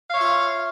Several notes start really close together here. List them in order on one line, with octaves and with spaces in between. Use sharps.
F5 C#5 E5 F4